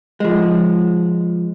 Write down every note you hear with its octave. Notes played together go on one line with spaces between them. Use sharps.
F3 G#3